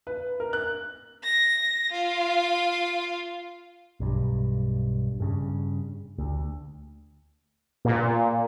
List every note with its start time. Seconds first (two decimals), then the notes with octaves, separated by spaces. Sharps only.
0.07 B4
0.40 A#4
0.53 F#6
1.24 A#6
1.92 F4
4.00 B1 G2
5.20 G2 C#3
6.18 D2
7.85 A#2